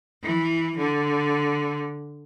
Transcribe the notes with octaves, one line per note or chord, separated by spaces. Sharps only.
E3
D3